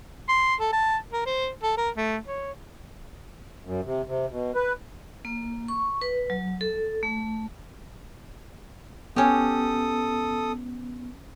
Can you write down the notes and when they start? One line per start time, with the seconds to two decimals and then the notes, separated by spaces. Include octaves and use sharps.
0.29 C6
0.60 A4
0.73 A5
1.13 A#4
1.26 C5
1.63 A4
1.78 A#4
1.97 A3
2.28 C#5
3.65 F#2
3.85 C3
4.07 C3
4.31 B2
4.55 B4
5.25 A#3
5.68 C#6
6.01 B4
6.30 F#3
6.61 A4
7.03 A3
9.16 B3 C#4 G4 A4 D#6